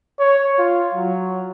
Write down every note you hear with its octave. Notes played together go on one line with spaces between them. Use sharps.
C#5
F4
F#3